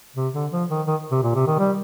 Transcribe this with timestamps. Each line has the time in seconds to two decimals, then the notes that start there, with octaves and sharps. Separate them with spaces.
0.16 C3
0.33 D3
0.52 F3
0.69 D#3
0.87 D#3
1.11 C3
1.23 A#2
1.35 C3
1.47 D#3
1.59 G3